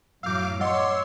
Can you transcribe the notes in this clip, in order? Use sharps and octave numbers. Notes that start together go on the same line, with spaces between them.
F#2 A2 F#3 F5 D6 E6 G6
C#5 D#5 F#5 C6 D6 E6